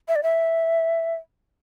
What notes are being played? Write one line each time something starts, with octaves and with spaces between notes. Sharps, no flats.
E5
D5
E5